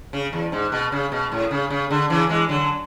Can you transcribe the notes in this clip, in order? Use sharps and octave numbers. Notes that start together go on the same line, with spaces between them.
C#3
E2
G#2
B2
C#3
B2
A2
C#3
C#3
D3
C#3 E3
E3 G#3
D3 F#3